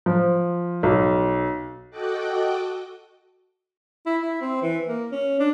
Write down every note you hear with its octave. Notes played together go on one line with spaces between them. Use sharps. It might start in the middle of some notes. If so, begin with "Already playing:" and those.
F3
B1
F#4 A4 D#5 G5 D6 F#6
E4
E4
C4
E3
A#3
C#4
D4